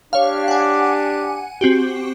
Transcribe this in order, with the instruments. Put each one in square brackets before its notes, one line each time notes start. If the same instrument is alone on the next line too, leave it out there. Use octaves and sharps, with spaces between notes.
[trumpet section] D4 G4 [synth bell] C#5 F5
[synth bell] F#5 G#5
C4 F#4 G4